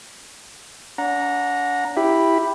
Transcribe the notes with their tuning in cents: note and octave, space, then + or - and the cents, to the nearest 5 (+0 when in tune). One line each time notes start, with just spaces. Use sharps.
D4 -40 F#5 -25 A#5 +0
E4 +0 G4 +0 B5 +0